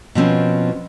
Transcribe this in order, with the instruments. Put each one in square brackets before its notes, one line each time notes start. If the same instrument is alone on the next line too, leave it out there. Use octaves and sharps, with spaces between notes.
[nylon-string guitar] B2 F3 C4 C#4